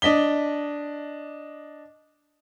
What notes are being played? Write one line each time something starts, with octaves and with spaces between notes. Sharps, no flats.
D4 D#5 B6 G7